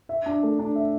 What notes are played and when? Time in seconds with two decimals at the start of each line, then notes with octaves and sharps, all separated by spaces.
0.09 E5
0.26 D4
0.43 A3
0.59 D4
0.76 E5